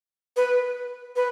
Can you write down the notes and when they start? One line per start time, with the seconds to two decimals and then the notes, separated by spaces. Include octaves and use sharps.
0.37 B4
1.16 B4